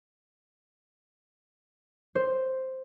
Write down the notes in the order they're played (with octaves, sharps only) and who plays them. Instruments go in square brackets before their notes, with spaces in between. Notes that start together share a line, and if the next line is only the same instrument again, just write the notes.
[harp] C5